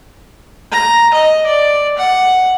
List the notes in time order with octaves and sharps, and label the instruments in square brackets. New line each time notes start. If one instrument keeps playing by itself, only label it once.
[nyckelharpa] A#5
D#5
D5
F#5